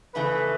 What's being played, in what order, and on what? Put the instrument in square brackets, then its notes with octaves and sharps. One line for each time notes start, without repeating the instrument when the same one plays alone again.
[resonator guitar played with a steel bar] F2 C#3 E3 A3 [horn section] A4 B4